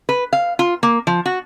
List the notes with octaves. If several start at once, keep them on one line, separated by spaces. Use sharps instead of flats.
B4
F5
F4
A#3
F3
F#4